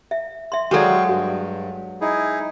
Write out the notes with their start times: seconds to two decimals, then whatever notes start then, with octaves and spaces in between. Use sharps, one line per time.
0.11 E5
0.52 E5 C6
0.71 F#3 G#3 F#4 A4 D5 F5 G5 C#6
1.09 G2 F#4
2.01 D#4 E4 G#4